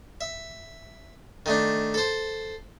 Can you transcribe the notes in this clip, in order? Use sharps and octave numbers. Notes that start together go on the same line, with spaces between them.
E5
D#3 A3 D4
A4 C5